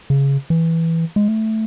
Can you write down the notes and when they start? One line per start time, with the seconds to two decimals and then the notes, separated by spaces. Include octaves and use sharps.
0.10 C#3
0.50 E3
1.16 G#3
1.28 A3